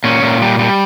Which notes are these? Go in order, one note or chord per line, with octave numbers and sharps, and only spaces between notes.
A#2 C#4
A#2
G3
G3